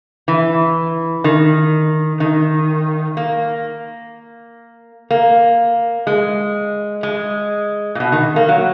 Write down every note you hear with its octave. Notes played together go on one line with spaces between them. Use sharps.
E3
D#3
D#3
A#3
A#3
G#3
G#3
A#2
B2
D#3
A#3
F#3